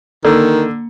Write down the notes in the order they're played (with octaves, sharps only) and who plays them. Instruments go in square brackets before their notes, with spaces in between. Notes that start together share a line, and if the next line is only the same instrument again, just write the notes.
[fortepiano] D3 [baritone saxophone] D#3 [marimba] A#3